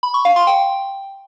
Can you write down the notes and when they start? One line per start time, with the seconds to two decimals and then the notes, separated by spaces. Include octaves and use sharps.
0.03 B5
0.14 C#6
0.25 F5
0.36 C6
0.47 G5